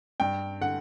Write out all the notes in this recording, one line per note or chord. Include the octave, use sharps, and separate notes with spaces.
G2 G5
D3 F#5